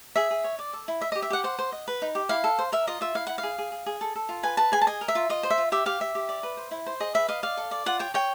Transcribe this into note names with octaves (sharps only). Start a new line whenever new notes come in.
G#4 E5
G#4
C#5
D5
A4
E4
D#5 E5
G4 D#5
E5
G4 F#5
C5 F#5
C5
D#5
B4
D#4
G4
E4 F5
A4
C5
A#4 E5
F4 D#5
F4 E5
E4 F5
E4 F#5
F5
G#4
G#4
G#4
G#4
A4
A4
F4
B4 G#5
B4 A5
G#4 G#5
A5
D#5 G#5
A#4
E5
F4
F4 D#5
C5
E5
F4
G4 E5
G4 F5
G4 E5
G4
D5
B4
C5
E4
C5
G#4 D#5
B4 E5
D#5 F5
D5 F5
A4
D5
F4 F#5
C#5 G5
C#5 G5